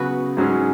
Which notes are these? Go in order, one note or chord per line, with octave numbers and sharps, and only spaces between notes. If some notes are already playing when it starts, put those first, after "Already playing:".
Already playing: C#3 F#3 B3 F#4 B4
G#2 F#3 C#4 G#4